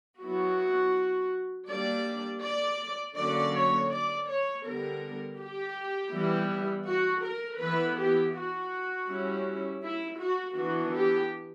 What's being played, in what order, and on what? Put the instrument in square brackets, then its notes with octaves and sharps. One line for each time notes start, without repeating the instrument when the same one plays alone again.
[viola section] F#3 B3 E4 F#4
G3 A#3 D4 D5
D5
D3 F#3 A#3 C#4 D5
C#5
D5
C#5
D3 G3 B3 A#4
G4
E3 G3 B3 E4
F#4
A#4
E3 B3 E4 B4
G4
F#4
G3 C#4 E4
E4
F#4
E3 B3 D4 F#4
G4